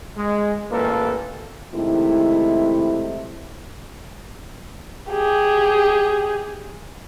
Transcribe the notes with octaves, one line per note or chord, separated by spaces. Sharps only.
G#3
A1 A#2 A#3 A4 B4
C3 D#3 G#3 A3 E4
G4 G#4